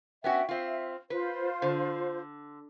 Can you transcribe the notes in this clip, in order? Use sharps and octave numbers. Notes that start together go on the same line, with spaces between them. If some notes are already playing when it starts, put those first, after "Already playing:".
B3 C#4 F#4 E5 G5
C4 F4 E5
F4 B4 C5
D3